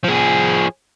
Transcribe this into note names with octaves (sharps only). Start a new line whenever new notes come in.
F3 G#4